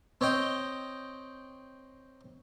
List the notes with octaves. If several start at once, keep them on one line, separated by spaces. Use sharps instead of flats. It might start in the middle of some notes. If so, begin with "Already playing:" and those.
C4 C#5 D#5 G5